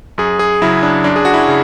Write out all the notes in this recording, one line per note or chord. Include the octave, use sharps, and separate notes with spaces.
F#2 G#4
G#4
C#3 F#3 E4
D4
F#2 D4
G#4
F#4
E4
C#3